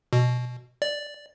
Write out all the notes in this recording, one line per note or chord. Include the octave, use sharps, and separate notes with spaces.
B2
D5